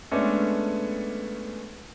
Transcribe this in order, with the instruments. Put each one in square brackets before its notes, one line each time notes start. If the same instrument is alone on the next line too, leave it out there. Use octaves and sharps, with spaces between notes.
[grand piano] G#3 A3 B3 C#4 D4 A4